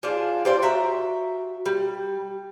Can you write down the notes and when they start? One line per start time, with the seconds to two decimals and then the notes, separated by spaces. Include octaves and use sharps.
0.03 F3 D4 F4 G#4
0.45 G3 C5 D5
0.62 F#4 E5 A#5
1.66 G3